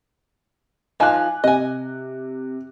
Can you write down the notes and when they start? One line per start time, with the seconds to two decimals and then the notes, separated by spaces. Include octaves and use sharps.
1.00 F3 D#4 F4 G#5 D6 F#6
1.44 C3 D#5 G#5